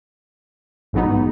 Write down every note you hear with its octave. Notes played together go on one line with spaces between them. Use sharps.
A1 G#2 F#3 B3 D#4